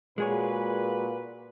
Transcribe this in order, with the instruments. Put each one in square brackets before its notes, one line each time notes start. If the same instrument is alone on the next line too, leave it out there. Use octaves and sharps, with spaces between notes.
[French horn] A#2 [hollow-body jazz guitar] G#3 G#4 C#5 [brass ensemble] F#4 B4